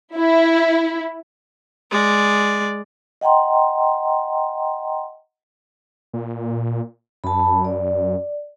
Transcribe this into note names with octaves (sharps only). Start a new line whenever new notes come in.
E4
G#3 D5
D#5 F#5 G5 A#5 C6
A#2
F#2 A5 B5
D5